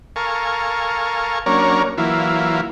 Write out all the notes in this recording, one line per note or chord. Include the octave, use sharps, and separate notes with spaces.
A4 A#4 F5 G#5 C#6
F#3 A#3 C#4 D4 A#4 C#5
E3 F#3 A#3 E4 F4